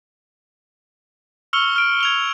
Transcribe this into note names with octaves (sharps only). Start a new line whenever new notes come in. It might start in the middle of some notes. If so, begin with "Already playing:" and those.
C#6 E6 F6 C#7 F7 G7
F6 D7
G#6 F7 G7